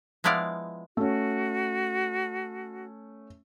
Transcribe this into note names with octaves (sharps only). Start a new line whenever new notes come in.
F3 G#3 B3 E4 D5 F5
A3 C#4 F#4